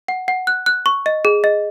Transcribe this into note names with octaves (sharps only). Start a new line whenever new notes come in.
F#5
F#5
F#6
F#6
C#6
D#5
G#4
D#5